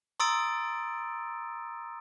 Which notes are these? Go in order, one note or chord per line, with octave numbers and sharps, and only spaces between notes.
A#5 C6 D#6 E6 A6 D7